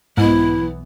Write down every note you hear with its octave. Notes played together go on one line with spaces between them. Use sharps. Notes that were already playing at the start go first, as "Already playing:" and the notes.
B1 G#2 E3 B3 E4